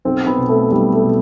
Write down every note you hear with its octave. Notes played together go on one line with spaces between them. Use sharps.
B1 C4
B3
B2
A3
B1 G3
A3
B2